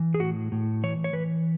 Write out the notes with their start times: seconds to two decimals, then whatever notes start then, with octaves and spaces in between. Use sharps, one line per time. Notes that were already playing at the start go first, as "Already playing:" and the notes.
Already playing: E3
0.14 G#4
0.20 A2 F#4
0.52 A2
0.83 E3 C#5
1.04 C#5
1.13 E3 B4